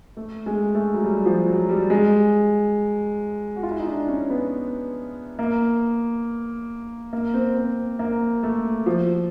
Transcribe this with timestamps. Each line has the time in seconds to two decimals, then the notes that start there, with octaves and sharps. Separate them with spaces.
0.17 A3
0.46 G#3
0.75 A3
0.93 F#3
1.04 G3
1.26 F3
1.47 F#3
1.69 G3
1.90 G#3
3.56 F#4
3.63 F4
3.71 E4
3.79 D#4
3.87 D4
4.08 C#4
4.30 B3
5.39 A#3
7.13 A#3
7.34 C4
7.56 C4
7.99 A#3
8.43 A3
8.86 F3